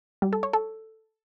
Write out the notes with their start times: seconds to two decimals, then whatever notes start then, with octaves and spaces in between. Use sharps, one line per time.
0.22 G3
0.33 A4
0.43 C#5
0.53 A4